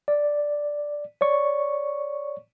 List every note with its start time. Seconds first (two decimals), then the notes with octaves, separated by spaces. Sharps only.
0.08 D5
1.21 C#5 D5 C#6